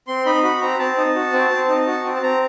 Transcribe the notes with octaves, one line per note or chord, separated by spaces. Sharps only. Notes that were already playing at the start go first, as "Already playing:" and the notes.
C4 C6
D#4 B5
F#4 B5
C4 A#5
C4 A5
D#4
F#4
C4
C4
D#4
F#4
C4
A5
C4 A#5